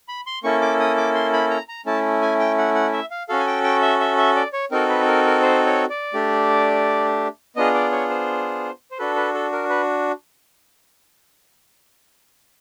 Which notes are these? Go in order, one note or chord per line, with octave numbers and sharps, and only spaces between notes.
B5
C6
A#3 C#4 E4 A4 C#6
D6
D#6
D6
C6
B5
A#5
A#5
A3 C#4 E4 A5
G#5
G5
F#5
F#5
E5
F5
C#4 F#4 A4 F5
G#5
G5
G5
E5
E5
E5
D5
C#5
C4 D#4 F#4 A4 A#4
B4
A#4
A#4
C5
C#5
D5
A3 D4 G4
B3 D4 F4 G#4 D#5
D5
C#5
C5
C5
D4 F#4 A4 B4
B4
A4
A#4
B4